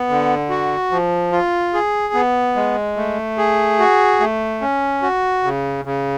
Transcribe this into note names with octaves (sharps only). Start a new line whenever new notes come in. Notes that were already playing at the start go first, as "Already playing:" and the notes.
Already playing: B3
D3
F#4
F3
F4
G#4
B3
G#3
A3
G#4
F#4
A3
C#4
F#4
C#3
C#3